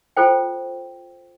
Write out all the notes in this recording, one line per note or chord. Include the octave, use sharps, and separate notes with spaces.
F4 A4 C5 G5